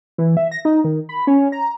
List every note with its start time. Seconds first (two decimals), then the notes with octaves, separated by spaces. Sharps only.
0.18 E3
0.37 E5
0.52 A#6
0.65 D#4
0.84 D#3
1.09 B5
1.27 C#4
1.52 A#5